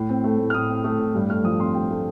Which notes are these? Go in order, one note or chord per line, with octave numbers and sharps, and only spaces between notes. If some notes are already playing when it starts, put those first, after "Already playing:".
Already playing: A2
C4
A3
A2
F6
A2 D#6
C4
A3 D#6
A2
G2
A3 F6
F3 D#6
C4 C6
G2 G5
A3